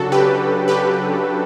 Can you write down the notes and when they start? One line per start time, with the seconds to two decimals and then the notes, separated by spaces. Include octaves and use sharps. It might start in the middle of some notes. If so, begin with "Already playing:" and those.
Already playing: C#3 F#3 D4 F#4 A4
0.12 G4 B4
0.68 G4 B4